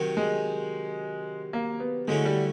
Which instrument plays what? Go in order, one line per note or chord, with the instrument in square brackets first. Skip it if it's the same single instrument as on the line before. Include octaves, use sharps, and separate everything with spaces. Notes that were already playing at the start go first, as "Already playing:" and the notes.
Already playing: [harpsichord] C3 D#3 F#3
[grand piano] G#3
A#3
B3
[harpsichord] D3 F#3 A3 C#4 E4 [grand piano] G#3
[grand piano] G3